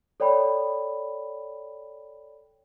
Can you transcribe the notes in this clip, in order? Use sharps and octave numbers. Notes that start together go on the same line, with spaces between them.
A4 C#5 D5 G5 B5